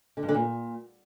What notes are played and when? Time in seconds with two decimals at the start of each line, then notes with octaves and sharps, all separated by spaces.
0.17 D3
0.23 G2
0.29 D3
0.34 A#2